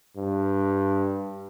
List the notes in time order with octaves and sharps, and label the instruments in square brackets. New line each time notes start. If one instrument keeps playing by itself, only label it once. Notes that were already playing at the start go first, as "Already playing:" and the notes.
[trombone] G2